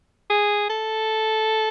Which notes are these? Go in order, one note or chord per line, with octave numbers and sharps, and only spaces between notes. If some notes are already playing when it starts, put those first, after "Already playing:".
G#4
A4